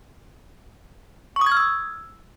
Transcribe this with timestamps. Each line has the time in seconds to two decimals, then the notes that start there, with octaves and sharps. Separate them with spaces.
1.36 C#6
1.41 D#6
1.46 G#6
1.52 F6
1.57 E6